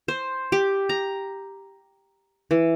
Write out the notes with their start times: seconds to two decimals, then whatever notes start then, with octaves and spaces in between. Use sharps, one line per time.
0.08 C5
0.52 G4
0.89 A#5
2.51 E3